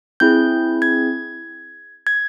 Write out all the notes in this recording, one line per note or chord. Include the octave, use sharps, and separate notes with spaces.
C4 E4 G#4 G6
G#6
G#6